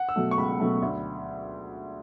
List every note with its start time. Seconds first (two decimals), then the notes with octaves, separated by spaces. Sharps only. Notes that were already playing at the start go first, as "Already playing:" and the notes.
Already playing: F#5
0.09 E6
0.16 B2 F#3 A3
0.31 C#6
0.38 C#2 B5
0.60 B2 F#3 A3
0.82 D2